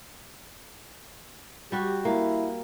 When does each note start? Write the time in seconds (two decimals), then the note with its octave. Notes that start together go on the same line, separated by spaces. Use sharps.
1.72 G3 F#4 G4
2.05 A#3 E4